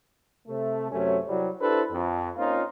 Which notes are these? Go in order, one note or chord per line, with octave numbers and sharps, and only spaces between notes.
C3 A3
F#2 C3 F#3 A3 C#4
C2 F#3 G3
D4 E4 G4 A4 B4 C5
F2
A#3 C4 C#4 D#4 F4